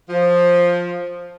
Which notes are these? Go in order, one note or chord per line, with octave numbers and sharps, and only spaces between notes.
F3